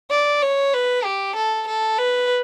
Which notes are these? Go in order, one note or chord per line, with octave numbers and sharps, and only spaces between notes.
D5
C#5
B4
G4
A4
A4
B4